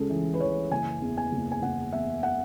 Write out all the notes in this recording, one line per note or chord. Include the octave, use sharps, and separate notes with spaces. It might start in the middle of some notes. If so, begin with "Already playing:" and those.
Already playing: C#2 C#3 G#3 G#4 A4
E3
B4
E3 C#5
F#1 G#5
E2
G#5
F#1
G#5
F#1 F#5
E2 E5
F#5